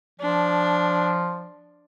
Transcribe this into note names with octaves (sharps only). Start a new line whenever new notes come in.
F3 D4